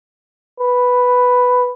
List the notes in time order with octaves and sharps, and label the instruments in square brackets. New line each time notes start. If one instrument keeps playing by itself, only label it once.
[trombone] B4